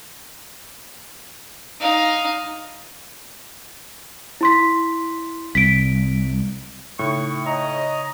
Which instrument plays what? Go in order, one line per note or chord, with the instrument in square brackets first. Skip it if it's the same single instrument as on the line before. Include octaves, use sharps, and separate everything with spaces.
[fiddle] D#4 F5
[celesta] E4 C6 B6
[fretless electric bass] C2 [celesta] B6 D7
[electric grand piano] A2 [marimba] C#3 D#4 [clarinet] C#6
[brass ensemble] C#5 D#5 [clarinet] A#5